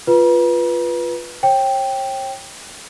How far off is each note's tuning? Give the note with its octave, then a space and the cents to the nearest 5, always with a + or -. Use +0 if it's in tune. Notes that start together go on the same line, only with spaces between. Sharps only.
F4 +0 B4 -10 A#5 +45
C#5 -40 G5 +0